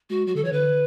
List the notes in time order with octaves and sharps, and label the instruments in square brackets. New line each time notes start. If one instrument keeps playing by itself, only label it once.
[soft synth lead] G#3 [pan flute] F#4
[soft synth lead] F#3 [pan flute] F#4
[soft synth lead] D3 [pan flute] A4
[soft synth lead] E3 [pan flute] C#5
[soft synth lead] D3 [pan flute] B4